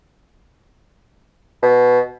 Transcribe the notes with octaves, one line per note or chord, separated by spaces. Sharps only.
B2